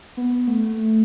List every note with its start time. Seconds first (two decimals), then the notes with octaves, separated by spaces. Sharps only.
0.17 B3
0.47 A3